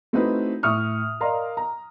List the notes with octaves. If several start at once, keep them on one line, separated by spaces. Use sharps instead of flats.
A3 C4 D#4 E4 F#4 B4
A2 E5 C#6 D#6 F6
A#4 D5 D#5 F5 A#5 C6
A#5